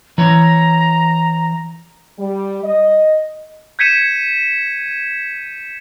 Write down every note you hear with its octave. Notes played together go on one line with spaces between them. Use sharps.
E3 C#5 A#5
G3
D#5
G6 G#6 B6 C#7 D#7 E7